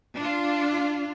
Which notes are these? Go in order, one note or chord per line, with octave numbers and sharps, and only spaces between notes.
D4 F4